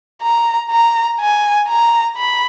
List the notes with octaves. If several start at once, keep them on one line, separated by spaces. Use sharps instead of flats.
A#5
A#5
G#5
A#5
B5